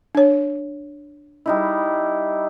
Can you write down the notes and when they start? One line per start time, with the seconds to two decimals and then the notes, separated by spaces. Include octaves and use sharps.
0.15 D4 C#5
1.46 G3 D#4 E4